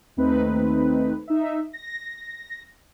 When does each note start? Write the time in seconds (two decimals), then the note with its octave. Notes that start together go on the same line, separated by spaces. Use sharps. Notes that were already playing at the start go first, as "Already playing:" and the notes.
0.17 D#2 A3 C4 D#4 B4
1.28 D#4 E5
1.73 A#6